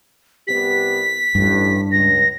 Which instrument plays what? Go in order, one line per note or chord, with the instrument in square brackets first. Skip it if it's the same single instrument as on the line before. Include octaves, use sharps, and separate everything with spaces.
[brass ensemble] C2 B3 G4 [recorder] B6
[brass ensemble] A1 [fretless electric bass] G2
[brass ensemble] C#2 [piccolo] A#6